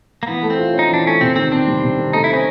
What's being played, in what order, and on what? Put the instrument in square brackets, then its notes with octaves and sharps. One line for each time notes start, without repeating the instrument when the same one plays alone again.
[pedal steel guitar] A#3
[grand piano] E3 [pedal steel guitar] B3
[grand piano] A3
[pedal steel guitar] C4
[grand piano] F4
C#4
[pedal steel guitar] D#4
[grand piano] E3 [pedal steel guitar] D4
[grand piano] A3 [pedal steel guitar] C#4
[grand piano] C3 [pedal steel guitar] C4
[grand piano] D#3 [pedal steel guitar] C4
[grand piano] C3 [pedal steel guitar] C4 D4
[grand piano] G3
C3
D#3
[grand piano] A3 [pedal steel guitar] D#4
[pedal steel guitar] E4
[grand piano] C4 [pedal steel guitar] C#4 D#4